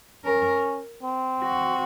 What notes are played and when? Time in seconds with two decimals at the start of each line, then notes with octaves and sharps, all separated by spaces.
0.25 C#4 A#4
1.03 C4
1.43 F#4